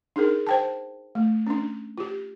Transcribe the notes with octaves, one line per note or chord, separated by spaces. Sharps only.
D4 D#4 G#4 A#4
C5 G5 A5
A3
C#4 D4
F4 G4